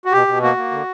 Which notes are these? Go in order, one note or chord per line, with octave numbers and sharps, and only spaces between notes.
F#4
B2 G4
B2
A#3 F#4
A#3
D3